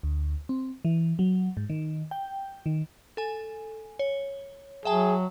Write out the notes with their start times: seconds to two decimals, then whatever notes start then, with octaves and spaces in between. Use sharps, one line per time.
0.03 D2
0.49 C4
0.85 E3
1.19 F#3
1.57 G#2
1.70 D#3
2.11 G5
2.66 D#3
3.17 A4 G#5
3.99 C#5
4.85 F#3 G#4 E5 G5 A5